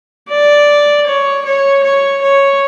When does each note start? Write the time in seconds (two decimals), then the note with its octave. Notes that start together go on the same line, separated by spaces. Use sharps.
0.30 D5
1.07 C#5
1.46 C#5
1.84 C#5
2.22 C#5